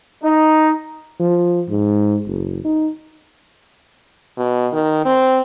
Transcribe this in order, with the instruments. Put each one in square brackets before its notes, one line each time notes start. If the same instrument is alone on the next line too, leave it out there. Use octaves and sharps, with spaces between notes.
[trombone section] D#4
[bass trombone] F3
G#2
F#1
D#4
[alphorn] B2
D#3
C4